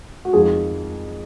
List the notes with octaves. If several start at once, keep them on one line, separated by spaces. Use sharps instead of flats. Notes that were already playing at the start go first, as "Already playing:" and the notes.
F#4
F2 D#3 G#3 F4 G#4